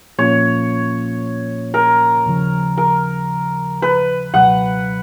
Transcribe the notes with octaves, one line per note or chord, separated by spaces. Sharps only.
A#2 F3 A#3 C#4 F4 C#5
A#4
D#2 C#3 F3
A#4
B4
C#2 B2 F#3 F#5